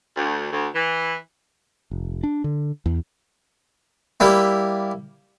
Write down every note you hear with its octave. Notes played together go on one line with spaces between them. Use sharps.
D2
D2
E3
F1
D4
D3
E2
G3 A#3 E4